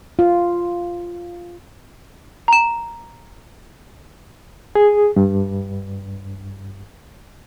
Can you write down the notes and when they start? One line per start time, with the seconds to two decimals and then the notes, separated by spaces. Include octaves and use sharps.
0.19 F4
2.48 A#5 E7
4.75 G#4
5.16 G2